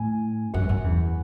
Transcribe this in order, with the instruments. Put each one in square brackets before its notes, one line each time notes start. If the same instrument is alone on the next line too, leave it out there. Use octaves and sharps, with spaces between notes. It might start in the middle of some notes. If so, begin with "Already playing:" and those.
Already playing: [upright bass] A2 [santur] G#5
[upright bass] F#2 [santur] F#5
[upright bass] F#2
E2